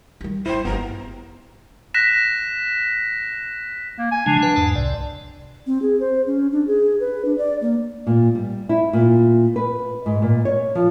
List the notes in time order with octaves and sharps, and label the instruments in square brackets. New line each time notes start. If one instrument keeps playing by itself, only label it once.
[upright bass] D#3 G3
[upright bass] G1 E3 [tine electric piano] E4 G5 [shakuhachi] C5
[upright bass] G1 [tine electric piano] B3 [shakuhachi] A#5
[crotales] F#6 A#6 B6 E7
[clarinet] A#3
G#5
[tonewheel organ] C#3 F3 G#3 [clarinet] D4
[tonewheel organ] B4 F#5
E2 G#2 A5
C2 C3 D5
[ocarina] C4
G#4
C5
C#4
D4
G#4
B4
D4
D5
A#3
[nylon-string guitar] A#2
G3
E4
A#2
B4
G#2
A#2
C#5
F3